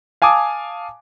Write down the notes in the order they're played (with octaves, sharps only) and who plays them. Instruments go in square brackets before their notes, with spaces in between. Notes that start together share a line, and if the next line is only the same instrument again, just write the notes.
[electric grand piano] F5 G#5 A5 D6 D#6